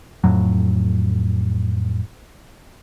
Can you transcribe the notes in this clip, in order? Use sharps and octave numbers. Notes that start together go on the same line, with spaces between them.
F2 A2 F#3